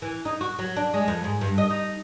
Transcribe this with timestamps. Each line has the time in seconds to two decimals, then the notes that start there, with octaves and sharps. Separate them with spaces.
0.02 E3
0.25 D#4
0.41 F#4
0.59 F#3
0.76 D4
0.94 G#3
1.08 F2
1.24 G#2
1.41 G2
1.58 D#5
1.70 D#4